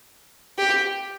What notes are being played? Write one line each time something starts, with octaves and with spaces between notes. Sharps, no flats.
G4